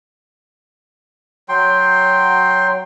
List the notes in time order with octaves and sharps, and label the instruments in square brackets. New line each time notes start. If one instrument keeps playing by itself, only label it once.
[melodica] F#3 G5 C6